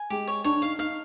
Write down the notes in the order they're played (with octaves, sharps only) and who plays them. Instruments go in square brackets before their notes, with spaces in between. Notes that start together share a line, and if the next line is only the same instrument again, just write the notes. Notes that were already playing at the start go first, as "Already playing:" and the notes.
Already playing: [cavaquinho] G#5
[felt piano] G#3 [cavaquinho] G4
[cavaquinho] C#5
[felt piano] D4 [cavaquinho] C#5
[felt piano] D#4 [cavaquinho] F5
[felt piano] D#4 [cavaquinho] F5